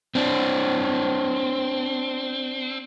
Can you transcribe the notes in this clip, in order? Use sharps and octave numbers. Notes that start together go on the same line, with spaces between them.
C4 D4